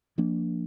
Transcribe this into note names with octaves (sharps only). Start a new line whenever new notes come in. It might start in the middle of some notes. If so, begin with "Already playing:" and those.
F3 A#3 D4